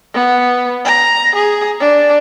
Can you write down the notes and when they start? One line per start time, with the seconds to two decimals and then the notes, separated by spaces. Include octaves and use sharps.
0.14 B3
0.85 A#5
1.35 G#4
1.80 D4